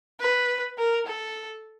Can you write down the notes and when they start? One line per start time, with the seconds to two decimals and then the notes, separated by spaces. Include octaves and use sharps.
0.20 B4
0.78 A#4
1.06 A4